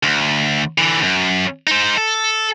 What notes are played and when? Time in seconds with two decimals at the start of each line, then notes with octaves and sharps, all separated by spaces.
0.03 D2
0.78 D3 E3
1.03 F#2
1.67 D#4 C5
1.97 A4